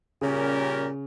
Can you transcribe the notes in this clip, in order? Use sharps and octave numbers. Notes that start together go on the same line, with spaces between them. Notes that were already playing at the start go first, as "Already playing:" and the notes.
A#2 C#3 G3 C#4 G4 A#4